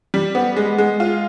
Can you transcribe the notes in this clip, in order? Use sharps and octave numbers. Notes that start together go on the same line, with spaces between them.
G3
B3
G#3
G#3
F4